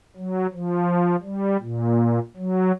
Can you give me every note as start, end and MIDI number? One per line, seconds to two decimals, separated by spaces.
0.17 0.47 54
0.53 1.16 53
1.23 1.57 55
1.61 2.19 46
2.37 2.72 54